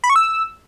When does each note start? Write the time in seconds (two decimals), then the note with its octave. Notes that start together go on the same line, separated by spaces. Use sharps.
0.04 B5
0.10 C#6
0.16 E6